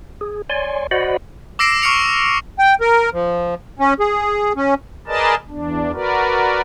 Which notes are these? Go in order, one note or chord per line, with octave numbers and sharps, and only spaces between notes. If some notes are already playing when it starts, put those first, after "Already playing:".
G#4
C#5 D5 G#5 C6
F#4 C5 D5 D#5 F#5 B5
D6 E6 A#6 C7 D7 E7
C#6 F6 C7 C#7 F7
G5
A#4
F3
C#4
G#4
C#4
G#4 A#4 B4 D5 D#5 A5
E2 D4
F#4 A#4 B4 D5